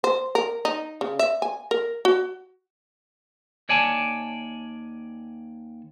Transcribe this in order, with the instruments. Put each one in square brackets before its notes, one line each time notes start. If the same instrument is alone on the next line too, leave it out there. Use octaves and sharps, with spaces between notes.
[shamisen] C5
A#4
D#4
C#3
E5
G#5
A#4
F#4
[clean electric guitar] D#2 C#5 D5 G#5 A5